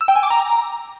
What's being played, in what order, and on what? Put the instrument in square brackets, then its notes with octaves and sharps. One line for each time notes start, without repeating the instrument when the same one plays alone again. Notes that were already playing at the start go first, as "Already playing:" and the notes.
[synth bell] E6
G5
G#5
D6
A#5